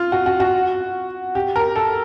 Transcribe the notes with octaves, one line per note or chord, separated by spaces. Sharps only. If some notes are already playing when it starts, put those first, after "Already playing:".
Already playing: F4
F#4
F#4
F#4
G4
A#4
A4